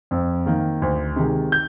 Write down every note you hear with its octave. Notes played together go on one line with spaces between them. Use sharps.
F2
D#3 A#3
D2
C3 D#3 G#3
G6